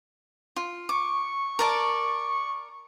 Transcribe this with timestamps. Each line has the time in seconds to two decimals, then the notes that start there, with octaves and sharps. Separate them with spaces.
0.56 F4
0.89 C#6 D6
1.59 A#4 D5 A5